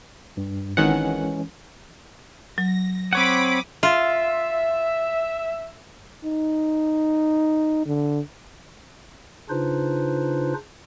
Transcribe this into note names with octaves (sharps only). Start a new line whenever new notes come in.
G2
G#1 D#3 E3 G#3 C#4 F#5
F#3 A#6
C4 C#5 F#5 B5 D6 D#6
F4 E5
D#4
D3
C#3 D4 D#4 F4 B4 C5